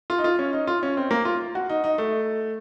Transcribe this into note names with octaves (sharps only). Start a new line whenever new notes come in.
F4
D#4
F4
C#4
D#4
F4
C#4
C4
A#3
F4
F#4
D#4
D#4
A3